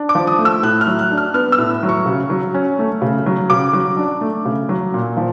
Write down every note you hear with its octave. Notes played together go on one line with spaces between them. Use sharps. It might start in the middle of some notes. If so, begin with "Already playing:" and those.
Already playing: D4
D6
F3
D#6
A3
E6
A2 F#6
F6
F#3
F#6
D4
F6
B3 F6
E6
A2
F#3
C#6
C#3
F#3
C#4
A3
C#3
F#3
C#3 D6
F#3
D4
A3
C#3
F#3
A#2
F3